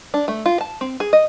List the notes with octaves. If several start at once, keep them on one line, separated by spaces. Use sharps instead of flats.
D4
A3
F4
A5
C4
G#4
D#5